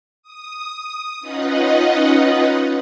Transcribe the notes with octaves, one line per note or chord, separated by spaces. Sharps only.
D#6
C#4 D#4 F4 B4 D#5 F#5